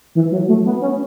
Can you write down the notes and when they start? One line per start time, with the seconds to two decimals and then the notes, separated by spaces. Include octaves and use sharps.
0.15 E3
0.32 F#3
0.48 A3
0.65 B3
0.81 C#4